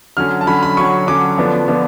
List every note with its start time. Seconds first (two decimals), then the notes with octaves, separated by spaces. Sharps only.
0.17 D3 F#3 C#4 F6
0.41 A5
0.47 D3 F#3 C#4 B5
0.63 B5
0.77 D3 F#3 C#4 C#6
1.07 D3 F#3 C#4 D6
1.38 D3 F3 B3 D4
1.68 D3 F3 B3 D4